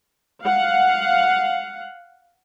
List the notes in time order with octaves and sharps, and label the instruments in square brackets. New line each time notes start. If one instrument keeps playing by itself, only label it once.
[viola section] F5 F#5